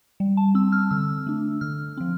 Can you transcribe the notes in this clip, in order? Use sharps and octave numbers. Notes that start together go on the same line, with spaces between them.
G3
A5
C4 E6
F6
D3 E6
A3 D4
D3 F6
F3 C4